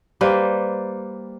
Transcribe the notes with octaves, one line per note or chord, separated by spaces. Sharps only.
G3 A#3 B4 C5